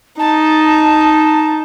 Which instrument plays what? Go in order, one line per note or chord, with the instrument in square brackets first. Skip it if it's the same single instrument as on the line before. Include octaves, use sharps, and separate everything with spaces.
[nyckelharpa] D#4 [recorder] A5